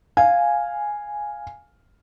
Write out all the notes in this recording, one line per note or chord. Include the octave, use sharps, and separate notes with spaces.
F5 G#5